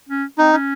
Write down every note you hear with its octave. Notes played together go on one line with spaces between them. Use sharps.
C#4
C4 D#4
C#4